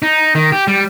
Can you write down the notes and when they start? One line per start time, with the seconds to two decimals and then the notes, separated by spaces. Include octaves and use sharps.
0.02 D#4
0.35 D#3
0.52 G4
0.67 G3